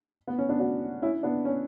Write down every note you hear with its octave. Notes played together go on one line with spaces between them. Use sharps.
B3
C#4
B3 D4
D4 F#4
C#4 E4
B3 D4
C#4